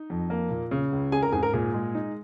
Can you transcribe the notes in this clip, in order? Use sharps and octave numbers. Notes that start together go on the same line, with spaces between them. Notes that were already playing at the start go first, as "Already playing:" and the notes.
Already playing: D#4
F2
A#3
A#2
C#3
C#2
C#4 G#4 G#5
A#4 A#5
G#2 G#4 G#5
A#4 A#5
A#2 G#4
G#3
D#4